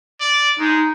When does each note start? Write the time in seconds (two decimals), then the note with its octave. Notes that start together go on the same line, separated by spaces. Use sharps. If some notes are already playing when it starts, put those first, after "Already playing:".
0.20 D5
0.59 G#3 D#4